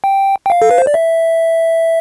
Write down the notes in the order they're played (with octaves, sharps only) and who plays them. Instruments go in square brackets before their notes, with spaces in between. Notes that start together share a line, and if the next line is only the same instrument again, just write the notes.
[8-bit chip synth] G5
G5
F5
A4
B4
C5
D5
E5